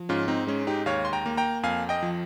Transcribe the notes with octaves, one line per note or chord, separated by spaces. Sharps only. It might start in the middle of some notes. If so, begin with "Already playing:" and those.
Already playing: F3
G#2 C#4 F4
C4 D#4
G#3 C#4
D#4 G4
D#2 C#5 F5
C6
G5 A#5
A#3
G5 A#5
F2 F5 G#5
D#5 G5
F3